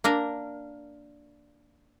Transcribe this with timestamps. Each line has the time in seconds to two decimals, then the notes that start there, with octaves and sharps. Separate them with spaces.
0.04 A#3 D4 A#4